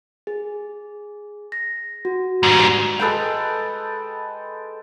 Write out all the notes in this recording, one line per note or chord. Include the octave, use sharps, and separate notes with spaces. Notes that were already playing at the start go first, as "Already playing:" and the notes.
G#4
A#6
F#4
G#2 G3
G#3 A4 B4 G5